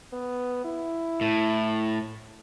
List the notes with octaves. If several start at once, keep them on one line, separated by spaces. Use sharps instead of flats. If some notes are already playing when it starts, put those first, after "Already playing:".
B3
E4
A2